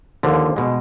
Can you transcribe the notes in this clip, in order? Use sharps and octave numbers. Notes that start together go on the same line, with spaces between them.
D#2 D3 F3
B2 G#3